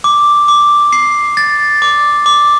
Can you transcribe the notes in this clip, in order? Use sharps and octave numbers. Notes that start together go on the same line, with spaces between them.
D6
D6
C7
A6
D6
D6